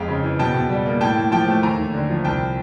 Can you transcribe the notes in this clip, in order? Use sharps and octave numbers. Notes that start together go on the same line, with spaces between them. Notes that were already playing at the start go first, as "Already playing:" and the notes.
Already playing: F2 G#3 F5 G5
C#3
E3
B2 G5 A5
B2
G3
A#3
A2 G5 A5
A2
F3 G5 A5
A3
D#2 G#5 A#5
D#2
D3
F3
C2 G5 A5